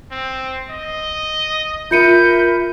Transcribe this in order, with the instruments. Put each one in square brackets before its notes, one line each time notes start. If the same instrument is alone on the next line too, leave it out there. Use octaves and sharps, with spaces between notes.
[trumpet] C4
D#5
[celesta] F4 C#7 D#7 [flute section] A#4 E5 B5 [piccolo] G6